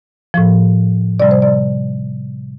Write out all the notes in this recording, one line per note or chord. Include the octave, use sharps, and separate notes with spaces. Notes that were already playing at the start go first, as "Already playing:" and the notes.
A2 F3
C3 G3 D5
C5
D5